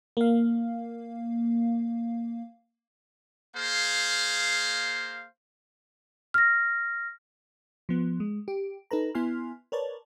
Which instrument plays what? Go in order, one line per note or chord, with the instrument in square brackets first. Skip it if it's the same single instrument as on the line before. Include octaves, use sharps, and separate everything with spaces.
[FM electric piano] A#3 F5
[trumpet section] A#3 G#4 C5 F5
[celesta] F6 A#6
[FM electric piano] F3 B3
G#3
G4
D#4 A4 B4 A#5
B3 E4 G#5 C6 F6
A#4 B4 C#5 D5 A5